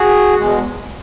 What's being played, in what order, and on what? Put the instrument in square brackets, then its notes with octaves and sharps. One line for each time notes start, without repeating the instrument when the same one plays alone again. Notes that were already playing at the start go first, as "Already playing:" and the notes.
Already playing: [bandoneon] F#4 G#4
E2 B2 G#3